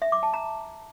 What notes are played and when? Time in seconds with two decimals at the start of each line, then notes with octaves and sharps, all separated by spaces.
0.02 E5
0.12 D6
0.23 A5
0.33 A#5